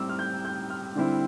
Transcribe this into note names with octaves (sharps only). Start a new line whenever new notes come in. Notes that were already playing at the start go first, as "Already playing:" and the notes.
Already playing: A2 G3 C4 D6 E6
F6
G6
G6
F6
D3 G3 C4 E4